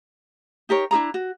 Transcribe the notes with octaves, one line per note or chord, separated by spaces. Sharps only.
D#4 G4 A#4 C#5
D4 E4 G#4 A#5
F#4